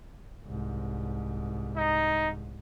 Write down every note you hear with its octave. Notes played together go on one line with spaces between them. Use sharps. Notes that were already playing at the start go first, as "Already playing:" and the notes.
C2 G#2
D#4